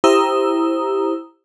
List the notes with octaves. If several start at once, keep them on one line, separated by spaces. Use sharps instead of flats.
E4 G4 C5 A#5 D#6 E6